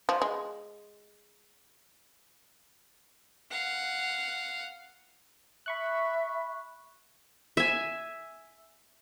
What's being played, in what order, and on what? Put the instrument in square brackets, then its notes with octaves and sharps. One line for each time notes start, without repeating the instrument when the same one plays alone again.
[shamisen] F3
G#3
[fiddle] F5 F#5
[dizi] E5 [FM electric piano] B5 C#6 F#6
[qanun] E5 G#5